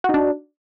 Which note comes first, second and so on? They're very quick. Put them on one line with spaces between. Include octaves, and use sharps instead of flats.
F#4 D#4 D4